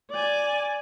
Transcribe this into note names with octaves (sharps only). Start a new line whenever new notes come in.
D5 G#5